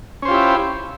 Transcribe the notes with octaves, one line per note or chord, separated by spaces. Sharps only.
C#4 E4 F4 G4 C5